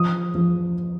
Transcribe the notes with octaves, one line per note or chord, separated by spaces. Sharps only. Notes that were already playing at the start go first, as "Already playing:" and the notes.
Already playing: F3 D#6
F3